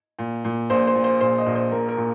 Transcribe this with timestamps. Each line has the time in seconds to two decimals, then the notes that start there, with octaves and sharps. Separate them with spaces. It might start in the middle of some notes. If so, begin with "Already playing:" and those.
0.19 A#2
0.44 A#2
0.70 A#1 C5
0.87 C5
0.95 A#2
1.04 C5
1.21 A#1 C5
1.38 D#5
1.46 A#1
1.55 C5
1.72 A#2 A#4
1.89 A#4
1.97 A#2